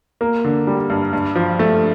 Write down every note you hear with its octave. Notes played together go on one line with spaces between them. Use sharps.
A#3
D3
G3
G2
G2
F3
A3